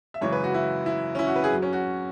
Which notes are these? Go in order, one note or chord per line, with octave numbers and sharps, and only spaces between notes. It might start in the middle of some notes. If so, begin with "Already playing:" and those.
E5
F#2 C#3 E3 G#3 C#5
B4
F#4
E4
E4
C#4
E4
F#4
B4
G#4
F#2 F#3
C#4
F#4